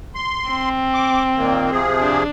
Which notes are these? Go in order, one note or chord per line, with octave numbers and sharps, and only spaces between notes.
C6
C4
D6
A#2 D#3 A#3
C3 F3 G#4
D4